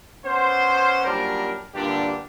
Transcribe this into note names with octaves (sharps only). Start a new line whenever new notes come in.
B3 C#4 C5
F#2 A#2 G3 D4 A#4
G2 A#2 D3 D4 G4